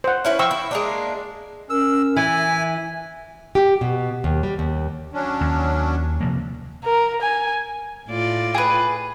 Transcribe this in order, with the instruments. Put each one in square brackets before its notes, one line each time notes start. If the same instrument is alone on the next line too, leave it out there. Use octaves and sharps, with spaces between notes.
[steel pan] C5 F#5
[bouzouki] C#4 E4 B4
[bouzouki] F3 [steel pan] G5 C#6 E6
[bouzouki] E4
G#3 A#3 D4
[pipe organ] C#4 A#4 [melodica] E6
[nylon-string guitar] E3 [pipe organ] E5 [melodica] G#5
[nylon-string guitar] G4
B2
D#2
G3
D#2
[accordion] F#3 C#4 D4
[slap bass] D#2
C3 F3 A#3
[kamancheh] A#4
G#5
[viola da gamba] A2 F4 D5
[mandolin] G#4 B4